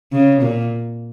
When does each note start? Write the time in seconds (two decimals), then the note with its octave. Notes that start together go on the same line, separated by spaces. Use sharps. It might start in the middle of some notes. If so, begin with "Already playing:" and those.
0.12 C#3
0.42 A#2